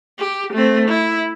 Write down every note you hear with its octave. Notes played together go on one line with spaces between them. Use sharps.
G4
A3 C4
E4